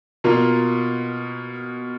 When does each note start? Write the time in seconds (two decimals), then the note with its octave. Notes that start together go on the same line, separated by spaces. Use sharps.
0.24 B2 A#3 F4